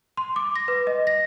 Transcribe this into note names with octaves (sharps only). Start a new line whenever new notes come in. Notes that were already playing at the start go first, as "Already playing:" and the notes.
C6
D6
A#6
B4
D#5
A#6